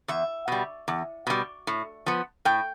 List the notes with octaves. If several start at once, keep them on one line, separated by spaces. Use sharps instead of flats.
E2 E5
B2 G3
E2
B2 G3
A2
F3 B3
A2 G5